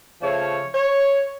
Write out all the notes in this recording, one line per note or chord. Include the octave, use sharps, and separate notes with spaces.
C#3 F3 A3 C#5
C#5